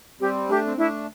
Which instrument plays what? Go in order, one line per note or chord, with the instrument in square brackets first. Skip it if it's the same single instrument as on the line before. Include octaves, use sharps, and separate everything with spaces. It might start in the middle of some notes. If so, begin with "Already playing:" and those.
[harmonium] G3 C4 [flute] G4
[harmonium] A3 D4 [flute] G4
[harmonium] C4
[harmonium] A3 D4 [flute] E4